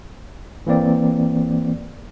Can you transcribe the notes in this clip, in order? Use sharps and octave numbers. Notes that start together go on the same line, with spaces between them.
E3 A#3 C4 D5